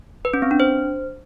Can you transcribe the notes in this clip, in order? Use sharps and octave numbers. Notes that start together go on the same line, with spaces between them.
B4
C#4
C4
D4
C5